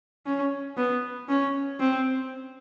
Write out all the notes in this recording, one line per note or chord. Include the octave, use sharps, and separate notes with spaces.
C#4
B3
C#4
C4